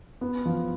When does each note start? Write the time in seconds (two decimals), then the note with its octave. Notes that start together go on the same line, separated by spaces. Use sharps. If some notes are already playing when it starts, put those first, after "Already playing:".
0.21 B3
0.45 F3